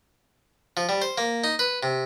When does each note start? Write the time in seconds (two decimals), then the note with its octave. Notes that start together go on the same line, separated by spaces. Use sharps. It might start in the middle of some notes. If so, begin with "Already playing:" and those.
0.77 F3
0.89 G3
1.02 C5
1.18 A#3
1.44 D#4
1.59 B4
1.83 C3